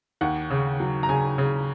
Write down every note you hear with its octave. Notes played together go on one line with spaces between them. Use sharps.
D#2 F#5
C#3
F#3
A#5
C#3 G#5
C#3